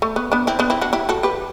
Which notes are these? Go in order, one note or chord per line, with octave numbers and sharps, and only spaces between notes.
A3
B3
B3 D4
C4 E4
B3 D4
C4 E4
D4 F#4
E4 G4
F#4 A4
G4 B4